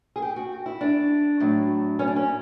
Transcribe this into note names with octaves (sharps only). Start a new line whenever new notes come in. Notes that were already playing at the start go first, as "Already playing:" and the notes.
G#4
G4
F#4
E4
D4
A2 F#3
C#4
D4
C#4